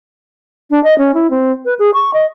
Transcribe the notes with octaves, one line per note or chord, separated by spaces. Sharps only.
D4
D#5
C#4
E4
C4
B4
G#4
C#6
D#5